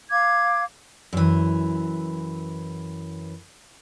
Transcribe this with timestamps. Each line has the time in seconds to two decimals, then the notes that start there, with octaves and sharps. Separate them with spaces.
0.11 F5 D6 G#6
1.13 F#2 E3